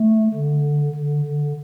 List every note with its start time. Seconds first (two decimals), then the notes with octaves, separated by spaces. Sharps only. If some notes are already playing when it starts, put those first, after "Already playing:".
Already playing: A3
0.34 D3
0.95 D3
1.25 D3